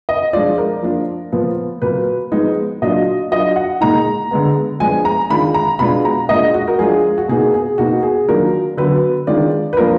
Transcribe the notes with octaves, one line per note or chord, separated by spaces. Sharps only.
D#5
F3 G#3 D4 F4 D5
A#4
F3 A#3 D4 F4
A#2 F3 B3 F4
A#2 F#3 A#3 B4
F3 G#3 B3 D#4
A#2 F#3 D4 F4 D#5
F#3 D4 F4 D#5
F#5
A#2 G#3 D#4 A#5
D3 G#3 B3
F3 G#3 B3 D4 G#5
A#5
D#3 G#3 D4 F4 B5
A#5
B2 G#3 D4 F4 B5
A#5
A#2 G#3 D4 F4 D#5
F#4
A#4
F3 G#3 D4 F4 G#4
F#4
B2 A#3 D#4 G#4
G#4
B2 A#3 D#4 F#4
G#4
D#3 F#3 A#3 D4 F4 A#4
D3 F#3 B3 B4
D#3 G#3 D4 F4 D5
B4
F3 A#3 D4 F4 A#4